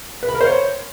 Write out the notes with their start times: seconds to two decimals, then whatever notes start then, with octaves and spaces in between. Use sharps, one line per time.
0.23 B4
0.29 B5
0.35 A#4
0.41 C5
0.47 C#5